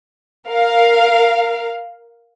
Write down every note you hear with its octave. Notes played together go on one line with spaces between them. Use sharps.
A#4 F5